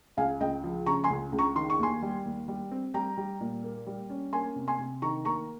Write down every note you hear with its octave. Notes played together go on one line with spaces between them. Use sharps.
C#2 F5 G#5
C#2 D#5 G5
F3
C#3 A#5 C#6
G#5 C6
C#2
C#2
A#5 C#6
D#3 C6
C#6
D#2 G#5 C6
G3
D#2
G3
C4
G3 G5 A#5
G3
A#2
A#3
G3
C#4
A#3 G#5 C6
C3
G#5 C6
C3
D#3 A#5 C#6
A#3 A#5 C#6